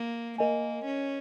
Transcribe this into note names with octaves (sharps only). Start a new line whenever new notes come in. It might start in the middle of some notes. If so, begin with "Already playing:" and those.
Already playing: A#3
A#3 A#4 D#5 G#5
C#4